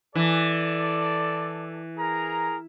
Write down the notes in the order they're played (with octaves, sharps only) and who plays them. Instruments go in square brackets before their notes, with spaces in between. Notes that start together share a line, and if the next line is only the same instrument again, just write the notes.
[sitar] E3 [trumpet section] A4 D5
[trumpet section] G#4 A#4 A#5